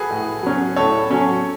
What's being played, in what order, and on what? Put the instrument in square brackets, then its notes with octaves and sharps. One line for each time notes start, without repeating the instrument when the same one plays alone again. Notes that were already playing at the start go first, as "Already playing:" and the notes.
Already playing: [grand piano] F#4 G#4 A4 B4
[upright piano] A2
F#3 C#4
[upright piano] A2 [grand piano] A4 C#5
[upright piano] F#3 C#4